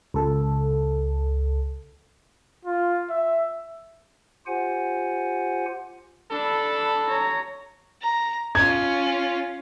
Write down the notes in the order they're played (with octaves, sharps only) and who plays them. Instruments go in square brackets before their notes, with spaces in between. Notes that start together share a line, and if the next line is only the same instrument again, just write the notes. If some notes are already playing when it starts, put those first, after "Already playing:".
[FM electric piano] C#2 A4
[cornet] F4
E5
[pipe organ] F4 G4 C5 F#5 G#5
[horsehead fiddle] D4 B5 [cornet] A4
[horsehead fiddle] C#5 A#5
[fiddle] A#5
[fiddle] C#4 F4 [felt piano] G#6